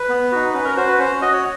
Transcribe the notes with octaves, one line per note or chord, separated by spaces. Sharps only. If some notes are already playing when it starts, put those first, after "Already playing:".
Already playing: B4
B3
D#4 F#4
C#4 B4
A#4
F#4 C5
B4
C#4 C5
F#4 D#5
C#5